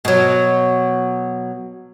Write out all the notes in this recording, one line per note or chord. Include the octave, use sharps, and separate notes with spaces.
B2 F#3